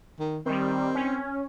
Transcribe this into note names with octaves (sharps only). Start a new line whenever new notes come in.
D#3
D#3 G3 C4
C#4